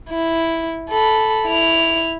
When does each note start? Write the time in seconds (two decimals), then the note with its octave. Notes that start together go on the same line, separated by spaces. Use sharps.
0.10 E4
0.90 A4 B5
1.47 E4 F7